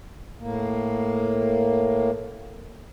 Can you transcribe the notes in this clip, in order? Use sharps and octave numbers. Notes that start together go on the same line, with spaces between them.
A2 A#3